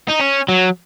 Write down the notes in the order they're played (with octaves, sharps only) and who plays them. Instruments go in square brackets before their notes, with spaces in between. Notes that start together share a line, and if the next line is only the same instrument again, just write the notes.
[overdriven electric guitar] D#4
C#4
F#3